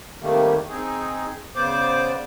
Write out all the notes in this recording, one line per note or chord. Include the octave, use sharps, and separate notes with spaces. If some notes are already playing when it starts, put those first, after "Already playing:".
C3 D#3 G3 A3 A#3
C4 D#4 G#4
C#3 B3 C5 D5 D6